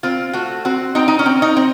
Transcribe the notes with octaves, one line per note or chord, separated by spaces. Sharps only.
C4 F4
A3 F#4
C4 F#4
C4 D#4
D#4
C#4
C4
D#4
C4